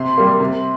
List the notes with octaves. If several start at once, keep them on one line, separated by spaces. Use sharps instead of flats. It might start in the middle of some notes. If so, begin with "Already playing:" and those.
Already playing: C3 C6
G3 A#3
C3